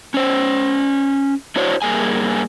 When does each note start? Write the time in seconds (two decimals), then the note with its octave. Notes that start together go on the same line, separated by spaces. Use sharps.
0.14 C#4 C5
1.56 D4 E4 F#4 C5 C#5
1.82 G2 A#3 G#4 G#5